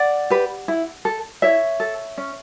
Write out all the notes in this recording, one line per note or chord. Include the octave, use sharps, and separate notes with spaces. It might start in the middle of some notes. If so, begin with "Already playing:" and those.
Already playing: D5 F#5
G4 B4
E4
A4
E4 C#5 E5
A4
C#4